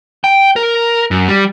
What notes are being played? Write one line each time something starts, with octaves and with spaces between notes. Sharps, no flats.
G5
A#4
F#2
G3